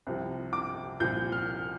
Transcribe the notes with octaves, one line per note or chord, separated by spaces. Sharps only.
C2 C3 F3
D6
C2 A#2 F3 G6
F6